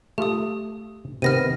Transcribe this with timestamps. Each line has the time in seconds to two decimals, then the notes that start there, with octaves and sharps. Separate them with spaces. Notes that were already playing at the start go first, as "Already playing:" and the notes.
0.18 A3 F4 G4 A4 D#6
1.22 C3 D#3 B3 F6 A#6 D#7